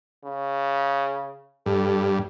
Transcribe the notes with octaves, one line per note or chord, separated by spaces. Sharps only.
C#3
G2 A4